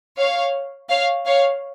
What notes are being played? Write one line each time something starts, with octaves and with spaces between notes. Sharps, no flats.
C#5 F5
C#5 F5
C#5 F5